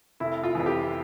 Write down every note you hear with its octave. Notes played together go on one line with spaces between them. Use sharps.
F1 E4
F4
F2 E3
G4